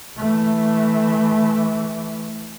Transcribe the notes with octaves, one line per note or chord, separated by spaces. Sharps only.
E3 A3